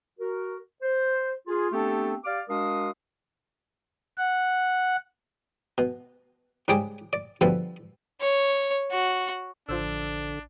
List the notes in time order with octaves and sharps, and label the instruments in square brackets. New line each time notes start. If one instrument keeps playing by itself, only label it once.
[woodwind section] F#4 A#4
C5
F4 G#4
A3 B3 C4 D4 G4 A4
G4 D5 F5 D6 F6
G#3 D4 F#4 A#4 F5 D#6
[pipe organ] F#5
[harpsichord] B2
G#2 C#3 G3 G4 G#4 D6
D5
B2 D3 F3 G3 A4 B4
[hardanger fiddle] C#5
F#4
[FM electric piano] A1 [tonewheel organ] D3 [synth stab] F3 C5 E6 [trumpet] D4